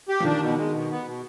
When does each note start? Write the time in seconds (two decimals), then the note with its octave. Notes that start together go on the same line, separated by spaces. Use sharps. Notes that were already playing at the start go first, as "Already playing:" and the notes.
0.09 G4
0.20 F3
0.24 D#3 D4
0.41 B2
0.58 G#3
0.73 B2
0.91 B3
1.06 B2